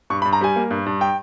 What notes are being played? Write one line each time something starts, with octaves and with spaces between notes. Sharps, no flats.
G2 C#6
B5
G2
A#5
G3 G#5
A#3
G2
G2
G5